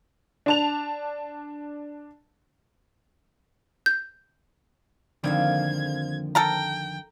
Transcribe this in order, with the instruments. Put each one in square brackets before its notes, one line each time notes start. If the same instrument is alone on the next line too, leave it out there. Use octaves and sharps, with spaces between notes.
[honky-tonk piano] D4 A5 F7
[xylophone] G6
[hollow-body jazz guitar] F2 D3 D#3 [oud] F3 A#3 C4 [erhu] G#6
[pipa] A4 A#4 A#5 [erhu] G5